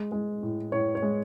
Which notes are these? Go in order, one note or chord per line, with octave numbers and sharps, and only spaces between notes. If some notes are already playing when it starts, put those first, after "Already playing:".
Already playing: G#3
G#3
A2
A2 C#5
C#5
G#3